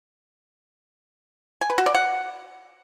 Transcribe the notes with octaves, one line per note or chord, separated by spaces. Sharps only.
G#5
B4
F#4
D5
F#5